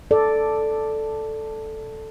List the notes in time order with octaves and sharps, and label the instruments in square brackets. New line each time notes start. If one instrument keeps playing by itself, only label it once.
[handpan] A4 D5